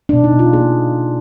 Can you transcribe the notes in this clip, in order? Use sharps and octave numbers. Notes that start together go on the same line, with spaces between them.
D4
B2
D#4
B2
F4
A#3 G#4